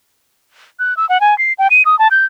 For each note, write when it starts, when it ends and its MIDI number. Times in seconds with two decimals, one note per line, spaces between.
0.79 0.96 90
0.97 1.08 88
1.09 1.20 78
1.21 1.37 80
1.38 1.53 96
1.59 1.68 79
1.71 1.83 99
1.85 1.98 87
1.99 2.08 81
2.11 2.25 91